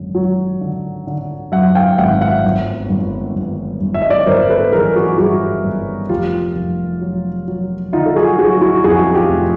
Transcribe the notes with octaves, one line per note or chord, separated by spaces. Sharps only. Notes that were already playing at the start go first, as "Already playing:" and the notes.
Already playing: G#1 F#2 D3
F#3
D3
D3
F#2 E5 F#5
F5 G5
G#1 E5 F#5
E5 F#5
G1
G1
G1
G1
E5
D#5
D5
C#5
G1 A#4 C5
A4 B4
E3 G#4 A#4
F#4 G#4
G2 F#4 G#4
G1
F1 F4 G4
F1
F#3
F#3
D3 D#4 F4
A4
F#4 G#4
F#3 F#4 G#4
E4 F#4
F2 F#4 G#4
F4 G4
F1